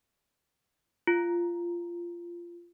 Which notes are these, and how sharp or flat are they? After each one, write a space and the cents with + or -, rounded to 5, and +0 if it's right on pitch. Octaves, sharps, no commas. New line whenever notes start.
F4 -15